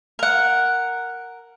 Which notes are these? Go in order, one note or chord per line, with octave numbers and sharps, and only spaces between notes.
A#4 F#5